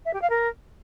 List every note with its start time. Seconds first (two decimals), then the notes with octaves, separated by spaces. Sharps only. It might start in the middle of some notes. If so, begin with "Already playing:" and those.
0.05 E5
0.13 G4
0.22 F5
0.30 A#4